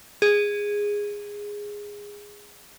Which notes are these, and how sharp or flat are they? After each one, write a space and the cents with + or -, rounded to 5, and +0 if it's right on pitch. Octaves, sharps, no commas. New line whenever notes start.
G#4 -10